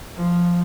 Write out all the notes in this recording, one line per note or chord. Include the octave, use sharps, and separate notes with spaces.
F3